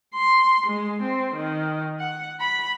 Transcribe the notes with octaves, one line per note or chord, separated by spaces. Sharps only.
C6
G#3
C4
D#3
F#5
B5